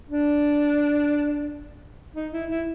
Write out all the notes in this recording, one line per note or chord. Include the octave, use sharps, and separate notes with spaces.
D4
D#4
E4
E4